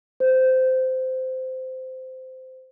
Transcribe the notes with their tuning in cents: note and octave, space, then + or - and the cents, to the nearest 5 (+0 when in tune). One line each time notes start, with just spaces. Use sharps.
C5 -15